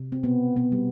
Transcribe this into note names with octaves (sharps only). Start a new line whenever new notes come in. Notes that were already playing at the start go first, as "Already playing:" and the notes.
Already playing: C3
C4
B2 B3
B2 B3
G3